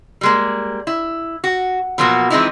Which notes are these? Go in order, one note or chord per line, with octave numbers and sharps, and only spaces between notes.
G3 G#3 A#3
E4
F#4
B2 F3 F#3 A#3 F#4
E3 F3 G#3 C4 D#4 E4